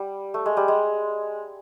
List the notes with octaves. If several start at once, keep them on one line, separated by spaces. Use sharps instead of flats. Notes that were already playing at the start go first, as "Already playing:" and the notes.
Already playing: G3
A3
G#3
G3
G#3